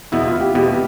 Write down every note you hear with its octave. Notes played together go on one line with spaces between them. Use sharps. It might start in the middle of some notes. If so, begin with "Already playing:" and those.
E2 B2 B3 E4
F4
G4
E2 B2 B3 G4